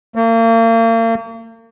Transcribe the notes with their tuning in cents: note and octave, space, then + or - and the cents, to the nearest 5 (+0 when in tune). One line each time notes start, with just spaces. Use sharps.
A#3 -40